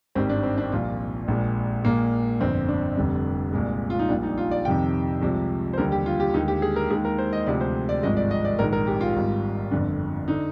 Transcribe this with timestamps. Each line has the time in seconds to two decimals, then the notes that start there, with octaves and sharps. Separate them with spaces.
0.15 G#1 G2 D#3 G3 C4
0.29 D4
0.43 C4
0.58 D4
0.72 C2 A#2 F3 F4
1.28 A#1 A#2 G#3
1.85 A#1 A#2 G#3 A#3
2.40 G1 F2 D3 C4
2.68 D4
2.97 F1 F2 D3 G3
3.53 C2 A#2 G#3
3.90 F4
3.99 D#4
4.09 A#1 A#2 G3 D4
4.23 D#4
4.38 F4
4.51 D5
4.65 F2 C3 D#3 G5
5.22 C2 C3 F3 G#3
5.73 C5
5.78 D#2 D3 G3 A#4
5.92 G4
6.06 F4
6.20 G4
6.34 D#2 D3 G#3 D#4
6.48 G4
6.62 G#4
6.76 A#4
6.90 D#2 D#3 G#3 G#4
7.05 A#4
7.18 C5
7.33 D#5
7.47 D2 C3 F3 G#3 D5
7.61 C5
7.89 D5
8.03 G#1 G2 F3 G#3 D#5
8.17 D5
8.31 D#5
8.45 D5
8.59 A#1 G#2 D#3 G#3 A#4
8.73 A#4
8.87 G4
9.01 F4
9.16 G#1 G#2 G3
9.71 G1 F2 D3
10.28 D3 D#4